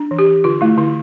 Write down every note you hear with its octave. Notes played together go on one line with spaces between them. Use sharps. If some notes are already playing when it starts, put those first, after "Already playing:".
Already playing: D4
E3
G4
E3
D3 F4
A3 E4
D3 E4